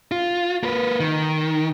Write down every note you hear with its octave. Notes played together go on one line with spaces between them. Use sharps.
F4
A#3 B4
D#3